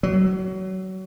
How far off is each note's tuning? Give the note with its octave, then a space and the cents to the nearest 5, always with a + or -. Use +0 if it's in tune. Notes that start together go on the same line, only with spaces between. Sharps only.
F#3 +25